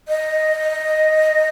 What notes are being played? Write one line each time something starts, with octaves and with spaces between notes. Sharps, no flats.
D#5